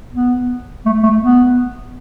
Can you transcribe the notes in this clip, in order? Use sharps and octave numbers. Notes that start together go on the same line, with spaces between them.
B3
A3
A3
B3